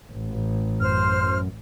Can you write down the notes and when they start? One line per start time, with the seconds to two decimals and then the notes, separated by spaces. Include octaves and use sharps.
0.12 A1
0.81 F#2 C5 F6